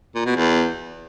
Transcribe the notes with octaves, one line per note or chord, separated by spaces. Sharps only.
A#2
B2
E2